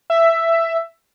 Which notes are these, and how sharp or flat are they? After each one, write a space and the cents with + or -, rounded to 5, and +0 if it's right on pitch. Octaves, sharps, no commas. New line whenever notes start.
E5 +10